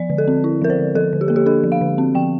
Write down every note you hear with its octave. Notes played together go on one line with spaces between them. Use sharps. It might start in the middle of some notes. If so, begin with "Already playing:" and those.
Already playing: F3 D5
D3
A4
C4
E4
F3 A#4
C5
D3
F3 A4
D3
G4
A#3 A4
G4
D4 A4
F3
F5
D3
C4
F3 G5